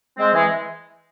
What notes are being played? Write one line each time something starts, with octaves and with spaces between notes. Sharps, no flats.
G#3 C4
E3 G#3